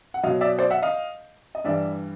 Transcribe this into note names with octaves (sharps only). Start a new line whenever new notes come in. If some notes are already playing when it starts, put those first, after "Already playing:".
F#5
B2 F#3 D#5 F5
D5 E5
C5 D5
E5 F#5
D#5 F5
D#5
G2 E3 G3 D5 E5